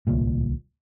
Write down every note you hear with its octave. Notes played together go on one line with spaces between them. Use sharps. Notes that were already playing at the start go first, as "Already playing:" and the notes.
D1 C2 A#2